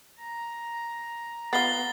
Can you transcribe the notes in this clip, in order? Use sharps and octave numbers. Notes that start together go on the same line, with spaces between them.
A#5
B3 F4 A6 C7 G7